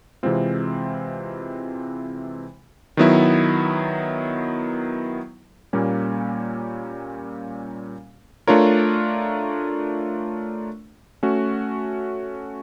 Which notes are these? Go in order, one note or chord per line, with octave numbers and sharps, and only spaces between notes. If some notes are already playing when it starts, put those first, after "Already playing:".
C3 E3 G#3 C4 F4
D#3 F#3 B3 E4
A#2 G3 A#3 C#4
A3 D4 F4 A#4 C#5
A3 C#4 F#4